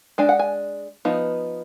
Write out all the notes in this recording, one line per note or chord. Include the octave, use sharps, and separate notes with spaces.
G#3 D4 G#5
F#5
G#5
F3 B3 D#4